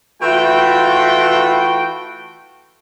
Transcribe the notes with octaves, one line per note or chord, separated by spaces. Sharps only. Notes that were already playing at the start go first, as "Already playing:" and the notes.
E3 A3 F4 F#4 G5